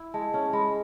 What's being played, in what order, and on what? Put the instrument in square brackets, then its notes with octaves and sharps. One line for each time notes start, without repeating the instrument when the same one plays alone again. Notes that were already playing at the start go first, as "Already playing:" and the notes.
Already playing: [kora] E4
[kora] G#3 [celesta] A5
[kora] C#4 [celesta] A5
[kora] G#3 [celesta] B5